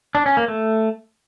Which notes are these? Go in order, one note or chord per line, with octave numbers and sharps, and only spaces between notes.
D4
C#4
A#3
A3